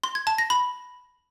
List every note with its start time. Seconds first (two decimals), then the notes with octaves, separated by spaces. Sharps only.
0.04 C6
0.15 G#6
0.27 A5
0.38 A#6
0.50 B5